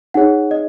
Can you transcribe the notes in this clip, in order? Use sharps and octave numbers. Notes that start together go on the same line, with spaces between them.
D#4 G#4 C#5 F#5
D#5